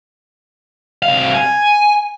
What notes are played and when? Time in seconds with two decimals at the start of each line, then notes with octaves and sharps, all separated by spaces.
1.02 C2 F5
1.34 G#5